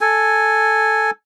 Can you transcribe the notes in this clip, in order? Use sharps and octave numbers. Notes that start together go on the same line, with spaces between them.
A4 G#5